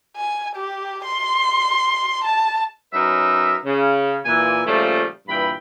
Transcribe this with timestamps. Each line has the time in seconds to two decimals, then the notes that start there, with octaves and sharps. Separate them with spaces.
0.17 G#5
0.56 G4
1.04 C6
2.25 A5
2.93 F#3 C#4 D#4 A#4 B4 E5
3.65 C#3
4.25 A#2 E3 G#5
4.66 A#2 C#3 F3 G3 A3
5.28 G2 A#2 E3 G5 B5